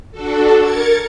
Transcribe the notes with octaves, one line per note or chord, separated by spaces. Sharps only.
D4 F#4 A4
A#4 G#6 A6 C#7